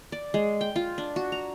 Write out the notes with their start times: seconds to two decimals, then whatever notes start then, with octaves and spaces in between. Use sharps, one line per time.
0.12 D5
0.34 G#3
0.61 G5
0.76 F4
0.98 D4
1.16 F#4
1.32 A#5